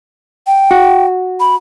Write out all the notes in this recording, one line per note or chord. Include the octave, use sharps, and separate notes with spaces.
G5
F#4
B5